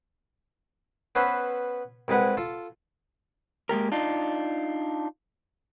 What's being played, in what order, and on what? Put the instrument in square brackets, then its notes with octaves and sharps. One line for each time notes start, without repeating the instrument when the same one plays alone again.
[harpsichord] B3 C#4 B4 C5 E5
C2 C3 G#3 B4 F#5
F4 A4
[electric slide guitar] G#3 A#3 G4 A#4
D4 D#4 F4